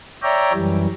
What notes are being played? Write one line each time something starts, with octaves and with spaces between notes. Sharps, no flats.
C#5 D5 E5 G5 A#5
F#2 E3 G3